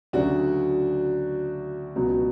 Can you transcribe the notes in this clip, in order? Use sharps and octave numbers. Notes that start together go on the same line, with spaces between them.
D2 C#3 F#3 D4 F#4
C#2 B2 F#3